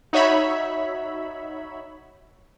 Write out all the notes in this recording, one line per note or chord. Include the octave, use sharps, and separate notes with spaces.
D#4 F#4 C#5 E5 B5